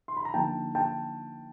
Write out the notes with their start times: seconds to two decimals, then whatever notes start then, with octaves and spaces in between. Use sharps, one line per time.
0.08 C6
0.17 B5
0.25 A#5
0.34 D3 F3 A#3 D#4 G5 A5
0.75 G5 A5